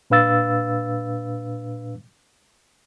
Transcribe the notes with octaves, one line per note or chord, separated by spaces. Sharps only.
A#2 D4 B4 F5 E6 A6